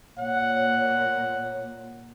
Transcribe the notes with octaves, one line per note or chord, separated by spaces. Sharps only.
A#2 C#5 F#5